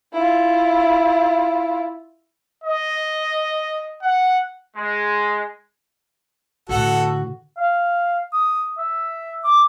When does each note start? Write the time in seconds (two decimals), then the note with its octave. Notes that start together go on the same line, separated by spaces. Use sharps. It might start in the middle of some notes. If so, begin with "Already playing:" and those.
0.13 E4 F4
2.64 D#5
4.03 F#5
4.75 G#3
6.69 A2 D3 F#4 A4 F#5
7.57 F5
8.33 D#6
8.78 E5
9.44 D6